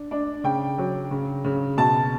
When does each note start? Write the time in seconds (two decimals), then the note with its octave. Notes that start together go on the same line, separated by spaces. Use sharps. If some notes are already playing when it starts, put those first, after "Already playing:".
Already playing: D4
0.11 D4
0.44 C#3 G5
0.78 F#3
1.11 C#3
1.44 C#3
1.77 B2 A5